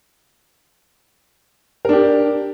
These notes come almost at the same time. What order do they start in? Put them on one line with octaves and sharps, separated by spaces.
A#4 D4 G4